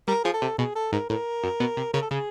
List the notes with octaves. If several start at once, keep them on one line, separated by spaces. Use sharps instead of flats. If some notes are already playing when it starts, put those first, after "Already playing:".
G3 A#4
F3 G#4
A4
C3
B2 G#4
A4
G#2 A#4
A2 A#4
F#2
B2
C3
C#3 A#4
A4
C#3 G#4